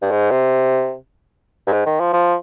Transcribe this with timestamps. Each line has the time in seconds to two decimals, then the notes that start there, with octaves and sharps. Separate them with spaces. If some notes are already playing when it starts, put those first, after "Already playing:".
0.02 G2
0.11 G#2
0.31 C3
1.67 G2
1.73 G#2
1.86 D#3
2.00 F3
2.13 F3